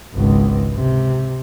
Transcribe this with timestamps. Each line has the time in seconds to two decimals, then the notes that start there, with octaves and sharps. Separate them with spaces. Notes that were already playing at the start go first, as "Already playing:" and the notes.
0.14 G#1 C#2
0.75 C3